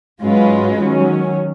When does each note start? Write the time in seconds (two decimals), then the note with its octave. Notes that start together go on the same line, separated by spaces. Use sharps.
0.22 G#2 F#3 G#3 C#4 F4 B4
0.79 D#3 F#3 C#4